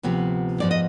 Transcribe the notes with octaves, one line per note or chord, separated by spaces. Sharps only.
D2 C3 F3 B3
G#2 F3 B3 D5
D#5